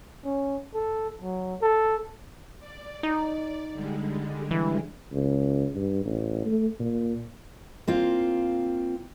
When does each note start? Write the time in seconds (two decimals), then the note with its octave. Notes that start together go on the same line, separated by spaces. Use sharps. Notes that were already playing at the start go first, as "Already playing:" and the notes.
0.25 C#4
0.74 A4
1.21 F#3
1.61 A4
2.60 D5
3.03 D#4
3.73 D3 G3 G#3
4.51 E3
5.12 C#2
5.76 G2
6.06 A1
6.46 A3
6.80 A#2
7.88 A#3 C4 F4